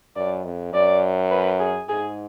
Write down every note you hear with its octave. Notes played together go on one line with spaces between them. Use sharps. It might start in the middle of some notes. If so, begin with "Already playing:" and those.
F#2 D5
F2
F#2 D5
B4
G#4
G#2 G#4